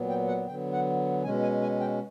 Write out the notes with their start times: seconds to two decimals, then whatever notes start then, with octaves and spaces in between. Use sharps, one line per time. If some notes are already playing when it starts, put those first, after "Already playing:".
Already playing: A#2 F#3 B3
0.09 G5
0.27 F#5
0.47 D3 F#3 B3 G5
0.73 F#5
1.23 B2 G#3 C#4 G#5
1.42 G#5
1.62 G#5
1.80 G5